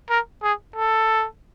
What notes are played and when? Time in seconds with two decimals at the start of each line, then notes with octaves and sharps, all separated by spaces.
0.10 A#4
0.43 G#4
0.76 A4